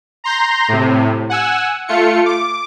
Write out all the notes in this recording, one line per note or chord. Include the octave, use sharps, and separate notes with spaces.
A#5 C6 G6 A#6
A2 C3
F#5 G#5 E6
A3 F4 C#7
D6